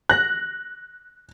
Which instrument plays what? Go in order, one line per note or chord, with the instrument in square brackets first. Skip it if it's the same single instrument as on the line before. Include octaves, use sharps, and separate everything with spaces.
[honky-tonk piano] F#6 A#6